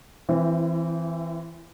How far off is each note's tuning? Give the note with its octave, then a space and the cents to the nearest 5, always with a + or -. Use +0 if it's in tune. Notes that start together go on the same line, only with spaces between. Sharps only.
E3 +0 C4 +0 E4 +35